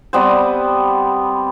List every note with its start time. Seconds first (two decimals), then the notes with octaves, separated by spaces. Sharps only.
0.13 G3 B3 C4 C5